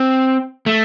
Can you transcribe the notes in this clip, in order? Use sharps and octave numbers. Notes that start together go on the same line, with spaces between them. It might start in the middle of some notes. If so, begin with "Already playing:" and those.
Already playing: C4
A3